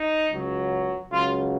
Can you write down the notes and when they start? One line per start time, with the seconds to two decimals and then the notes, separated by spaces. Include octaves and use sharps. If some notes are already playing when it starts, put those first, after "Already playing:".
Already playing: D#4
0.31 C#2 C#3 F#3
1.12 C#2 C#3 F#3 F4